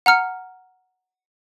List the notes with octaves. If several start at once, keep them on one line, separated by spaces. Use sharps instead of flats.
F#5 A#5 F6 C#7